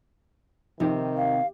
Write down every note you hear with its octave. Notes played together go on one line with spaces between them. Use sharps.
C3 D#3 F3 D#4 G4
F5